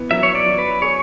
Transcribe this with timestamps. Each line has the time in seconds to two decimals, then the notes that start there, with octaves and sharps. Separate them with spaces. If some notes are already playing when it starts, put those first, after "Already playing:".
Already playing: E3 B3
0.11 F#3 E5
0.23 C#5
0.35 D5
0.46 F#3
0.58 B4
0.82 G#4 C#5